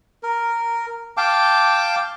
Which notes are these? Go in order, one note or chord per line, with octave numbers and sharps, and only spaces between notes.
A#4
F5 G5 A5 D6